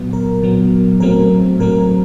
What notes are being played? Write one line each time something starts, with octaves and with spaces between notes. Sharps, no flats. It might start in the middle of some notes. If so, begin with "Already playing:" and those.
Already playing: A#2 F#3 B3
A#4
A#2 F#3 B3
A2 F#3 A3 C4 A#4
A2 F#3 A3 C4 A#4